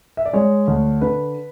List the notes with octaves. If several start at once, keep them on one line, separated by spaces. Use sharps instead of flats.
E5
D5
G#3 C#5
D2
D3 B4